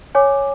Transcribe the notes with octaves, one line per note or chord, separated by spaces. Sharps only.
C#5 G#5 D6